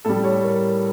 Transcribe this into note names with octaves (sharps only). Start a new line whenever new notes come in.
A2 G3 A4
C#5
A#4